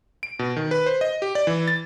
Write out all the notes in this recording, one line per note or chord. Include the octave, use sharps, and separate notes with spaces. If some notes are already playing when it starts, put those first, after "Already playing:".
D7
B2
D#3
B4
C5
D#5
G4
D5
E3
A6